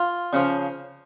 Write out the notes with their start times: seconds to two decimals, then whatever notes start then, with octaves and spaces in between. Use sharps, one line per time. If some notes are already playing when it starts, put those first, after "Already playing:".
Already playing: F4
0.33 C#3 F3